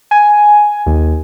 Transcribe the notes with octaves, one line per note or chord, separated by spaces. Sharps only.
G#5
D#2